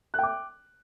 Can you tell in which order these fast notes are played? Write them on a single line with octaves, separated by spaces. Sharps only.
F#6 G5 D6